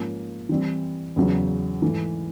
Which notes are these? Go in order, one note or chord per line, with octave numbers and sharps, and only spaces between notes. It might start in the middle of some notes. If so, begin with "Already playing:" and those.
Already playing: G#2 F3 A#3 C#4
E3 G3 C4 E4
E2 C#3 F#3
G#2 E3 A3